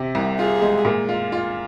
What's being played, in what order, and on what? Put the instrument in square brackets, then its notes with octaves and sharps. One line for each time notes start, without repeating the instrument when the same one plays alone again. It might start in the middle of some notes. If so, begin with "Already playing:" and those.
Already playing: [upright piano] C3
C2
[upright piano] F4 [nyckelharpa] G#4
[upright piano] G#3
A#2
F4
F4